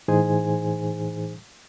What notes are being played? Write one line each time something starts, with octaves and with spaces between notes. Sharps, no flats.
A2 E3 D#4 G#4 C5 G#5